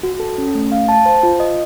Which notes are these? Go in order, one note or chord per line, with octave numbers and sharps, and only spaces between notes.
F#4
A4
C#4
A3
F5
A5
C5
F4
D#5